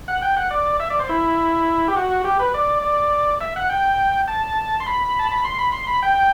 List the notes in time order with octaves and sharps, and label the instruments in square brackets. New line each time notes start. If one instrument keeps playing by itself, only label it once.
[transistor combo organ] F#5
G5
F#5
D5
E5
D5
C5
E4
G4
F#4
G4
B4
D5
D5
E5
F#5
G5
A5
C6
B5
A5
B5
C6
B5
C6
B5
G5